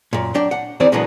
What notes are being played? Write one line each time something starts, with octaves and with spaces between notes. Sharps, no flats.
F#2 A#2
F#3 D4 G5
F#5
D2 D#3 E3 C4 G#4 D5
A#2 D3 E3 F#3 G#3 B3